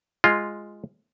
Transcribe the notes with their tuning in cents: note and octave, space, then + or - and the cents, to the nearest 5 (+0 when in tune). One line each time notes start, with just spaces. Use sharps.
G#3 +0 F4 +0